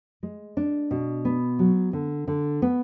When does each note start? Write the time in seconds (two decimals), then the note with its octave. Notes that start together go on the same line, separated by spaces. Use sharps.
0.23 G#3
0.57 D4
0.91 B2
1.25 B3
1.59 F#3
1.93 D3
2.28 D3
2.62 B3